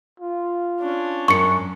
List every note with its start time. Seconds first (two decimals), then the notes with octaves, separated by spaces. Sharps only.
0.20 F4
0.80 C#4 D4
1.28 F#2 C#6 C#7